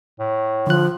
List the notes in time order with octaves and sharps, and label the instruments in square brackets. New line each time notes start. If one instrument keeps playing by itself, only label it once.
[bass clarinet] A2
[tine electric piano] D3 F#6 [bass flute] F3